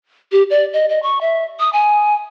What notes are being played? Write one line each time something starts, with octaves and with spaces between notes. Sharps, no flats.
G4
D5
D#5
D#5
C#6
E5
D#6
G#5